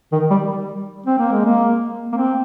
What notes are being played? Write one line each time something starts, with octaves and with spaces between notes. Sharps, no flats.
D#3
G3
C4
A#3
G#3
A#3
A#3
C4